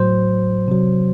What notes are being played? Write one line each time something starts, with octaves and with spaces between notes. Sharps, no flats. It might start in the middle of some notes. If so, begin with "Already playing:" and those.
Already playing: A2 F#3 C5
C3 F#3